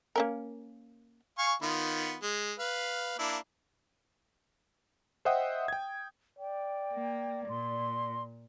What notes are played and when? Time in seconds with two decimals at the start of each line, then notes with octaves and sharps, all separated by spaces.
0.16 A#3 C#4 A#4
1.39 F5 G#5 C#6
1.62 D#3 B3 F4
2.23 G#3
2.59 B4 F5
3.19 A#3 D4 E4
5.25 C5 D#5 E5 F#5 G5 D#6
5.68 G5 G#6
6.39 D5 G5
6.93 A#3
7.49 A#2 C6